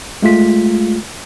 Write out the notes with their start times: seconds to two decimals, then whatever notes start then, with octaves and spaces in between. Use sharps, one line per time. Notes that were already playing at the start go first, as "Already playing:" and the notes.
0.22 G#3 A3 F4 B6